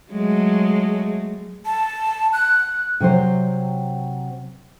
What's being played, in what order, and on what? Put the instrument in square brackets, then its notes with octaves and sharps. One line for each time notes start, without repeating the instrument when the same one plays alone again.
[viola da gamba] F#3 G#3 A3
[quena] A5
F#6
[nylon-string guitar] C3 F#3 C5